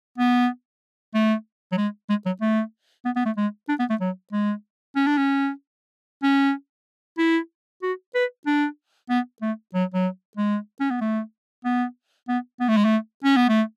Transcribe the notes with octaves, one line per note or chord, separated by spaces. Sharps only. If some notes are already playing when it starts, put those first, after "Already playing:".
B3
A3
F#3
G#3
G#3
F#3
A3
B3
B3
A3
G#3
D4
B3
A3
F#3
G#3
C#4
D4
C#4
C#4
E4
F#4
B4
D4
B3
A3
F#3
F#3
G#3
C#4
B3
A3
B3
B3
B3
A3
G#3
A3
C#4
B3
A3